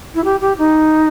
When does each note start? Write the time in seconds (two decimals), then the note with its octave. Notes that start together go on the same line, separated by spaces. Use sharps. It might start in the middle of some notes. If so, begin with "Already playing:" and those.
0.15 E4
0.24 G4
0.41 G4
0.58 D#4